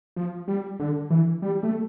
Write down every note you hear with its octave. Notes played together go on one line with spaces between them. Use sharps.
F3
G3
D3
E3
G3
A3